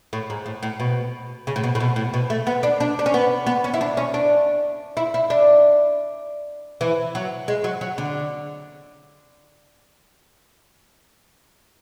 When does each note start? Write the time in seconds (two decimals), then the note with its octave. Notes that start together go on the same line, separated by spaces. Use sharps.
0.13 A2
0.30 G#2
0.46 A2
0.63 A2
0.80 B2
1.47 C#3
1.56 A2
1.64 B2
1.75 A2
1.80 B2
1.96 A2
2.14 B2
2.30 A3
2.47 B3
2.63 D4
2.80 D4
2.99 D4
3.06 C#4
3.14 B3
3.46 B3
3.64 C#4
3.74 E4
3.81 D4
3.97 C#4
4.14 D4
4.97 E4
5.14 E4
5.30 D4
6.81 E3
7.15 F#3
7.48 G#3
7.64 F#3
7.81 F#3
7.98 D3